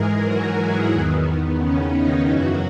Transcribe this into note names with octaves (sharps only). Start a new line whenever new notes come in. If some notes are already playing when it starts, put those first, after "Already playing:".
Already playing: G#2 E3 G#3 G#4 A#4
F#3 F#4
E3 E4
E2 D#3 B3
C#3 C#4
D#3 D#4
F#2 C#3 E3 F#3 F#4